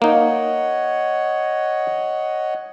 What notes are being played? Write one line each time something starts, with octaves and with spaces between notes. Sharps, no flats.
A#3 D#4 C#5 D#5 F#5